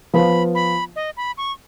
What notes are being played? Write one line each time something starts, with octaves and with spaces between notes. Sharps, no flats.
F3 B3 F4 B5
B5
D#5
B5
C#6